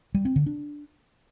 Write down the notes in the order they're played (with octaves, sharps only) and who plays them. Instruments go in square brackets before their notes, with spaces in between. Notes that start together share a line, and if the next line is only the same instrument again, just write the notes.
[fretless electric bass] G3
C4
D3
D4